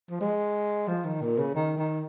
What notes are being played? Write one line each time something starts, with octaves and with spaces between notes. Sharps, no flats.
F3
G#3
F3
D#3
A#2
C#3
D#3
D#3